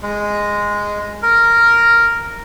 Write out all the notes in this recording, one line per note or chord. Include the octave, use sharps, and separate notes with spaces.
G#3
A#4